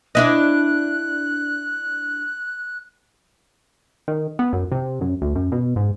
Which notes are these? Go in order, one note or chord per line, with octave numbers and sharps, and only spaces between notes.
D4 E4 D#5 F#6
D#3
B3
F#2
C3
F#2
D2
F#2
B2
G#2